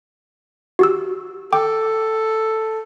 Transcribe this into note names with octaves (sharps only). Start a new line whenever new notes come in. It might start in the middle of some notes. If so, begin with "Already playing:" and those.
F#4 G4 E6
A4 G5 D6